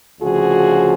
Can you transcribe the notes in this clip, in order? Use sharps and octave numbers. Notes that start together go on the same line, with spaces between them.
D2 C#3 F3 F#4 G#4